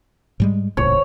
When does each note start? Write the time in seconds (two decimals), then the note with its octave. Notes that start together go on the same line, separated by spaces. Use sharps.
0.40 G#2 G3 G#3
0.77 D#1 C#2 A2 C#5